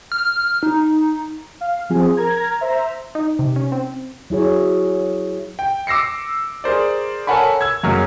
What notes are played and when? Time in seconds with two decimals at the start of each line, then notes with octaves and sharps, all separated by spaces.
0.12 F6
0.63 D#4
1.61 F5
1.90 F3 C4 G#4
2.17 A#4 A#5 G#6
2.60 C5 E5 A#5
3.15 D#4
3.39 C3
3.56 C#4
3.72 C4
4.30 F#3 E4 G#4 C#5
5.59 G5
5.87 D6 E6 A#6 C7 C#7
6.64 G#4 A#4 C5 D5
7.27 A4 A#4 C#5 F#5 G#5 B5
7.61 E6 G#6
7.83 F#2 F#3 G#3 A#3 F6